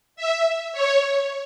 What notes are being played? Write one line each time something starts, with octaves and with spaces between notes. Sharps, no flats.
E5
C#5